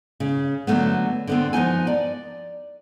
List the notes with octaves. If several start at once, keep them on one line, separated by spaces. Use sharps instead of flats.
C#3
D3 F#3 A3 B3
D3 B3 C4
F3 B3 D#4 G#5
D5